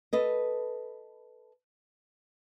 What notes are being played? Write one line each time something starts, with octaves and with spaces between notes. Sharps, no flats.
A4 B4 D#5